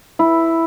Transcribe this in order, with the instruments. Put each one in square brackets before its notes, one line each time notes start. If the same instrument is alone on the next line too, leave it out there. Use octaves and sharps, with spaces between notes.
[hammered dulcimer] E4